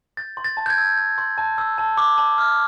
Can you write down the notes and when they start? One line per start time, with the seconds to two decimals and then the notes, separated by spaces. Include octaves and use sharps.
0.17 G6 A6
0.37 C6
0.44 A6
0.57 A5
0.66 G6
0.70 G#6
0.78 E6
0.97 G6
1.18 C6
1.38 A5
1.58 E6
1.78 A5
1.97 D6
2.18 A5
2.38 F6